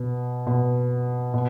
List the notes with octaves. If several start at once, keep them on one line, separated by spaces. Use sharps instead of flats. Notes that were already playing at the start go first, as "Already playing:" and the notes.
Already playing: B2
B2
B2